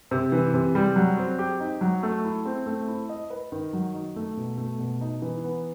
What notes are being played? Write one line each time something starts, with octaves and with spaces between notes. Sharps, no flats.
C3
E3
C3
G3
F#3
C4
G4
D#4
F#3
A3
E4
C4
A3
E4
D#5
B4
D#3
F#3
D#4
A3
B2
A3
B2
D#4
E3
B3